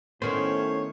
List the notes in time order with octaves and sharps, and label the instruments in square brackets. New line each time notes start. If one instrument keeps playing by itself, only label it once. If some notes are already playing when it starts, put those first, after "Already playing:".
[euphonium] A2 [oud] D#3 B3 [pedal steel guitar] C#4 C5 [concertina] C#5